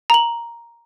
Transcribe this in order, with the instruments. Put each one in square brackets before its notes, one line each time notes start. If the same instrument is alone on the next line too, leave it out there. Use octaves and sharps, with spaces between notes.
[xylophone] A#5 F#7